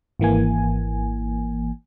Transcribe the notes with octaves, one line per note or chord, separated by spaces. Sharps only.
G#1 E3 A#3 G#5